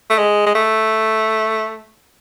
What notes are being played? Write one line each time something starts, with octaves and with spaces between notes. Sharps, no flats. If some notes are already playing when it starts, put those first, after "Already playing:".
A3
G#3
G#3
A3